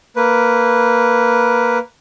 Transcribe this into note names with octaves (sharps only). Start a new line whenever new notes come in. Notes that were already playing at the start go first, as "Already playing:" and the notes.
A#3 B4